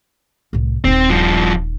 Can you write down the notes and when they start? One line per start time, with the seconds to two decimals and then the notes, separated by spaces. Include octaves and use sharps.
0.53 C2 A2
0.84 D#1 C4 D#4
1.10 G2 F3